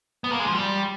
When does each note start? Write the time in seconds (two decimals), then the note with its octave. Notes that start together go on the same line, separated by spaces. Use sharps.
0.24 B3
0.32 A#3
0.39 G#3
0.47 F3
0.55 G3